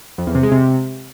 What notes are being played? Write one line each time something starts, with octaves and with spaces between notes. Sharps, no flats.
F2
E2
C3
G#3
C3